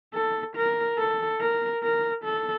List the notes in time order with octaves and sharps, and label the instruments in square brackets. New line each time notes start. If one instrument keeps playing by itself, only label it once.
[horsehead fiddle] A4
A#4
A4
A#4
A#4
A4